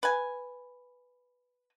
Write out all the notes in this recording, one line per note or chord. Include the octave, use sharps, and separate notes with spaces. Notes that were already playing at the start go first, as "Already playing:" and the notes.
B4 G#5